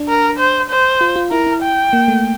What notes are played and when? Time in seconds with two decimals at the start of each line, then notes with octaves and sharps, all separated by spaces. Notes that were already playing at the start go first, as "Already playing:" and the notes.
Already playing: D4
0.08 A#4
0.39 C5
0.70 C5
1.01 F4
1.16 F4
1.31 E4 A#4
1.47 E4
1.63 G5
1.93 A#3
2.08 A3